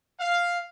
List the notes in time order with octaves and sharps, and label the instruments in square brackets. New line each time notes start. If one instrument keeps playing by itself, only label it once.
[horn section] F5